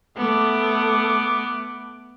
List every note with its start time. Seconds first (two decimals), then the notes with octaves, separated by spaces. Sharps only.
0.18 A3 B3 D6